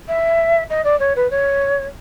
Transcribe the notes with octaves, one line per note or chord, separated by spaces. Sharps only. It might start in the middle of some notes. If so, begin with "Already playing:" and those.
E5
D#5
D5
C#5
B4
C#5